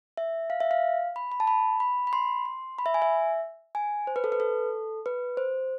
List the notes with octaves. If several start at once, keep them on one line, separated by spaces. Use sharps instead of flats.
E5
F5
E5
F5
B5
B5
A5
B5
B5
B5
C6
C6
B5
E5
G#5
E5
G#5
C5
B4
A4
B4
A4
B4
C5